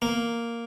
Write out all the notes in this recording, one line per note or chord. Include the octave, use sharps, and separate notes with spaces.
A#3